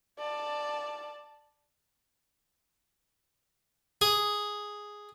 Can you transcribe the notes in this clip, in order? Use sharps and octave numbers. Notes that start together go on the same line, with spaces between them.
D5 A5
G#4